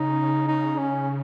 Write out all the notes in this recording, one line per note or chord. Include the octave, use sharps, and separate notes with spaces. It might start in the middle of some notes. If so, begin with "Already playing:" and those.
Already playing: C#3 D#4
D#4
C#4